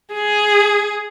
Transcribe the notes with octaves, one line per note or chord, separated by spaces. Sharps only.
G#4